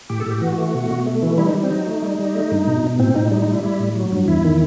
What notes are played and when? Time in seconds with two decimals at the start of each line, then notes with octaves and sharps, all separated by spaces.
0.10 A2 G4
0.20 A4
0.26 A2 G4
0.42 E3 F#4
0.58 A3
0.75 B2
0.91 B2
1.06 A3
1.23 E3
1.38 G3 E4
1.46 D#4
1.55 G3
1.63 C4
1.71 F#3 D#4
1.86 A3
2.02 G3
2.19 G3
2.35 A3
2.52 G2
2.67 B2
2.84 B2
2.99 A2 C4
3.15 A2 D#4
3.31 G3 D#4
3.42 D#4
3.47 G3
3.53 E4
3.64 G3 E4
3.80 A2
3.95 F#3
4.12 G2
4.28 E2 E4
4.45 D#3